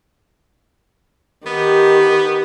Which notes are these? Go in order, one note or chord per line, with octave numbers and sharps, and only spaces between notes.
D#3 B3 G4